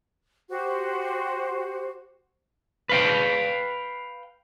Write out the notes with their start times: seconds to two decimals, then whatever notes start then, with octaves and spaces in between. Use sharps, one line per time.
0.50 F#4 G4 C5
2.89 B4 F5 G5